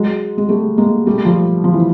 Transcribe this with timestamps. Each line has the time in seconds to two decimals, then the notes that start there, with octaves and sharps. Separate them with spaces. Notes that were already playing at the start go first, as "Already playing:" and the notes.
Already playing: F#3 G#3
0.38 G#3
0.49 G3 A3
0.78 G#3 A#3
1.06 G3 A3
1.25 F3 G3
1.64 F3
1.74 E3